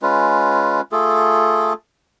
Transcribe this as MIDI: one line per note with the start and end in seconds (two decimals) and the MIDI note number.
0.02 0.81 56
0.02 0.81 61
0.02 0.81 65
0.02 0.81 71
0.92 1.73 57
0.92 1.73 65
0.92 1.73 68
0.92 1.73 69